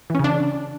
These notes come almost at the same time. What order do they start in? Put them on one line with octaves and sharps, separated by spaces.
E3 C#4 C#3 D4